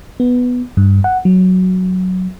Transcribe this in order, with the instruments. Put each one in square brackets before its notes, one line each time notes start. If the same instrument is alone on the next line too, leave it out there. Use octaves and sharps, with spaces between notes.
[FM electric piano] B3
G2
F#5
F#3